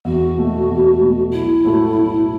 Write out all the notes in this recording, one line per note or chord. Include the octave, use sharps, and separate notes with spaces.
E2 F#4
B2 A3
E2
B2 A3
B1 E4
A2 A3 F#4 A4
B1